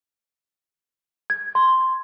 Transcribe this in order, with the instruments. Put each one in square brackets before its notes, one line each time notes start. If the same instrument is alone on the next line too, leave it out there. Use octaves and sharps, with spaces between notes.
[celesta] G#6
C6